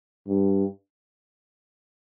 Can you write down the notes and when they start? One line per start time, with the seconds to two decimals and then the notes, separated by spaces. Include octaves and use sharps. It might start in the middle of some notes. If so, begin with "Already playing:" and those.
0.28 G2